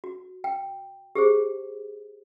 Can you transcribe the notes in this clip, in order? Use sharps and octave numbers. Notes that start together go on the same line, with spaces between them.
F#4
G5
G4 G#4 C5